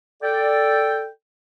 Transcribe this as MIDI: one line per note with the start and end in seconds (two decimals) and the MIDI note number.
0.22 1.07 69
0.22 1.07 74
0.22 1.07 79